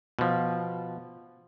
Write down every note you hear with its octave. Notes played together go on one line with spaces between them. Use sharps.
B2 F3